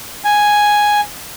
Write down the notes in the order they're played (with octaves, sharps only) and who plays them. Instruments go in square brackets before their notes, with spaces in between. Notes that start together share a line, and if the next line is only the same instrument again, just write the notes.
[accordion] G#5